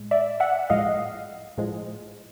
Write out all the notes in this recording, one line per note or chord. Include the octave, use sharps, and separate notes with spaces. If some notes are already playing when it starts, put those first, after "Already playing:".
Already playing: A2 G#3
D5 E5
E5 F#5
A2 F3 G#3 D#5 F5
A2 F3 G#3